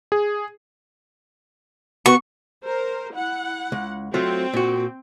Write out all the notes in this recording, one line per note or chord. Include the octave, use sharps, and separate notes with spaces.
G#4
B3 F#4 C#6
A#4 C5
E4 F#5
C#2
F#3 A3 C4 F4 G5
A#2 F#4